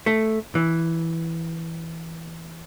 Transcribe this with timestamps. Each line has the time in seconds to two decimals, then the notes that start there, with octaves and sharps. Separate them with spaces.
0.06 A3
0.55 E3